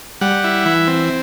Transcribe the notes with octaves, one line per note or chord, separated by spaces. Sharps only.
G3 F#5
E4
E3
C4